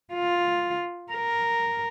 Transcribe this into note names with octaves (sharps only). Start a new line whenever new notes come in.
F4
A#4